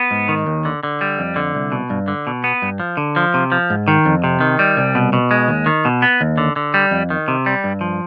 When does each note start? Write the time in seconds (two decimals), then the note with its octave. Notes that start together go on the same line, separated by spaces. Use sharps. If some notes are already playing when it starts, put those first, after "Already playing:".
Already playing: B3
0.11 G#2
0.28 D#3
0.47 D#2
0.65 D3
0.83 D3
1.01 G3
1.19 F2
1.36 D3
1.55 C2
1.72 B2
1.90 G2
2.08 D3
2.27 B2
2.44 B3
2.62 G2
2.80 F3
2.97 D3
3.16 F3
3.34 C3
3.52 F3
3.70 G#2
3.88 D#3
4.05 F2
4.24 C3
4.41 D#3
4.59 G3
4.77 C2
4.95 B2
5.13 B2
5.31 G#3
5.48 D#2
5.66 D#3
5.85 B2
6.02 B3
6.21 D#2
6.38 D3
6.56 D3
6.74 G3
6.91 F2
7.10 D#3
7.28 C3
7.46 G3
7.64 G2
7.81 F3